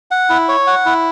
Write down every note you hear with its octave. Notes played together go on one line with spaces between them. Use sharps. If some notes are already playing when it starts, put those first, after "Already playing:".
F#5
E4
C#5
F#5
E4